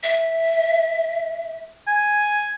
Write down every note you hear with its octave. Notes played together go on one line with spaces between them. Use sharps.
E5
G#5